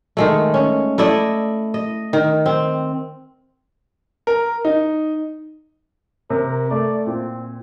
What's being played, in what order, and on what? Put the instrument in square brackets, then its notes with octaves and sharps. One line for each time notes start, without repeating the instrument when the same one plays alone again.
[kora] D#3 G#3 A3
C#4
A3 E4 D5 D#5
D#5
D#3
C4
[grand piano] A#4
D#4
[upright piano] C3 [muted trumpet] A#4
[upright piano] A3 [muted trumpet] D5
[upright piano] A#2 [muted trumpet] C4